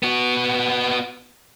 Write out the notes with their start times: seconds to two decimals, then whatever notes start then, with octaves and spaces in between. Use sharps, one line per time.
0.03 B3 F#4